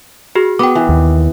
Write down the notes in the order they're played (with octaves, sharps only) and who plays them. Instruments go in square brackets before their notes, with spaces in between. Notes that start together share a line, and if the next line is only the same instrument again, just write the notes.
[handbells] F#4 G#4 F6
[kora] B3 [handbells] G5 D6
[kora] E3
[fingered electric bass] D#2